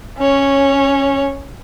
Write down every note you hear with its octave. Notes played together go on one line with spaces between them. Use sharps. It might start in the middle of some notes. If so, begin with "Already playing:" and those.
C#4 C#5